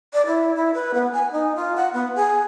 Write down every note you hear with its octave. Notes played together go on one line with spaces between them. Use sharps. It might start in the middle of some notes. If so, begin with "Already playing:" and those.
D5
E4
E4
B4
B3
G#5
D#4
F4
F#5
B3
G#4